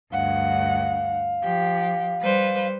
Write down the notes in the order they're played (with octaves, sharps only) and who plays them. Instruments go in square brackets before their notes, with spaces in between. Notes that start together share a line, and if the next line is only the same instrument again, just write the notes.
[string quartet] D2 G2 F#5 [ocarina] F5
[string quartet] F3 G4
G3 B4 C5